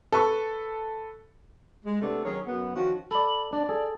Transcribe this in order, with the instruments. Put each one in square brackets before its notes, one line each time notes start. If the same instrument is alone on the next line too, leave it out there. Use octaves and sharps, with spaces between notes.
[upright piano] A4 B4 C#6
[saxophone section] G#3
C3 A3 B3 D4 A4
D#3 F#3 C#4 G#4 A#4 C#5
F#2 B3
D#3 F3 C#4 F#4
[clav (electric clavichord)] A4 D5 [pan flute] B5
[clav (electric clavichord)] D4 [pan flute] D5
[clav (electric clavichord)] G#4 A4